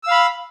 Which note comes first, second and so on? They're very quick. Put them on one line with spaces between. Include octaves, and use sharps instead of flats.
E6 F5 B5